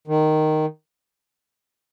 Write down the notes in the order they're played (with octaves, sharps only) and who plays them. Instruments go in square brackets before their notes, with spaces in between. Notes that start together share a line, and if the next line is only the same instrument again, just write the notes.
[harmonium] D#3